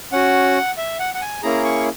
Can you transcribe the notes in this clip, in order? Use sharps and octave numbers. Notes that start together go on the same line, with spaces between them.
C#4 F#4 F#5
E5
F#5
F#5
G#5
A#3 C#4 E4 G#4 A#5
C#6